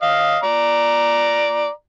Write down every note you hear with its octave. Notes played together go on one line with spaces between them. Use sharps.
D#5 F5
D5 A#5